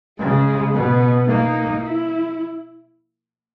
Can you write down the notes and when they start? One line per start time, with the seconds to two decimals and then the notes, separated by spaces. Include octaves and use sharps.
0.19 C#3 G#3
0.74 B2 B3
1.28 A#3 D#4
1.83 E4